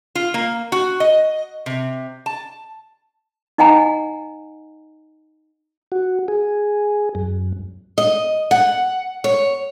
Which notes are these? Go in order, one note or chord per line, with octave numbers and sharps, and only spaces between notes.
F4
A#3
F#4
D#5
C3
A5
D#4 D#5 F#5 G#5 A#5
F#4
G#4
F#2
D#5
F#5
C#5